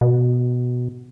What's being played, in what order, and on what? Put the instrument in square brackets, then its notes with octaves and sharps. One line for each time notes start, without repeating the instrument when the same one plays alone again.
[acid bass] B2